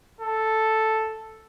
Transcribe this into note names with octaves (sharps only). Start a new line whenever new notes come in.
A4